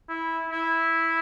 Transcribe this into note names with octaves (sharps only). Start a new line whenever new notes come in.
E4
E4